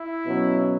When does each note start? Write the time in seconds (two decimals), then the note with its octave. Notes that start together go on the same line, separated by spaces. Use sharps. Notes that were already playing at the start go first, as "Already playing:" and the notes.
Already playing: E4
0.26 B2 F#3 C#4